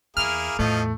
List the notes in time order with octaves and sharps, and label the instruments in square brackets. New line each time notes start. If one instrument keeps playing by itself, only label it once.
[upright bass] E2 [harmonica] A#3 E4 G#4 [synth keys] F6
[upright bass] E2 A2 [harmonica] F3 D#5 [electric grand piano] A3